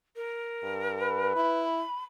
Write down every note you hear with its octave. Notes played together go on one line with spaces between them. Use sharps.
A#4
G2
B4
E4 B5